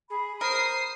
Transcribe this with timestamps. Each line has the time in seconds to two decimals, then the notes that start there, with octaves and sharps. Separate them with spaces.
0.10 G#4 B5
0.41 A#4 C5 D#6 C7